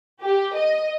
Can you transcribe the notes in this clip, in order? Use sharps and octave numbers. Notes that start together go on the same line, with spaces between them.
G4
D#5